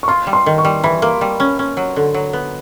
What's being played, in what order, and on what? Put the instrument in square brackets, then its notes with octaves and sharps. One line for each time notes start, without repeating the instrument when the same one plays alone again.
[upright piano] C#6
[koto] F4 [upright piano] C6
[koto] G3
[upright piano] C6
[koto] D#3
[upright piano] C#6
[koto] G3
[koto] E3 [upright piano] B5
[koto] A#3
G3
C#4
C#4
F#3
D3
F#3
B3